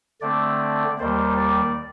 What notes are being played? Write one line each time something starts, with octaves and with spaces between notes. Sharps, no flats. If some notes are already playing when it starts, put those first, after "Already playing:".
D3 A3 C4 D5
D#2 D#3 G3 C5
D5